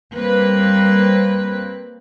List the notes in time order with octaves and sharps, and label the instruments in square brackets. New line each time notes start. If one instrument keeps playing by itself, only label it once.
[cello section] G3 A#3 C4 B4